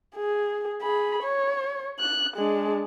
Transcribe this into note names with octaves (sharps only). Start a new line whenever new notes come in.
G#4
G#4 B5
C#5
F#6
G#3 D4